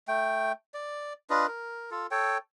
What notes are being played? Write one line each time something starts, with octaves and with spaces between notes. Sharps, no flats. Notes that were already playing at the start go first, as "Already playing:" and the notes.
A3 G5
D5
D4 F4 B4 D#5
A#4
F4 A4
A4 C#5 G5